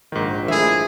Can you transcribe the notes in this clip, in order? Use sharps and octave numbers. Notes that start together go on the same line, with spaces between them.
A#1 G#2 D#3
E3 A3 E4 G#4 E5